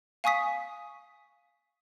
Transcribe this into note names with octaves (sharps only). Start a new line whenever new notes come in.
F5 G#5 C#6 D#6 B6